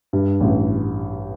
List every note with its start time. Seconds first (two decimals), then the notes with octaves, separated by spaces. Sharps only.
0.13 G2
0.41 A1